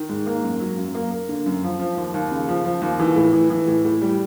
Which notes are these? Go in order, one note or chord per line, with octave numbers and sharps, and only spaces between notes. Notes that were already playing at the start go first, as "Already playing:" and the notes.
Already playing: D#3
G#2
A#3
F#2
F#3
F#2
A#3
A#3
D3
F#2
F3
F3
D#2
D#2
C#3
F3
F3
D#2
E3
A2
E3
E3
A2
A2
G3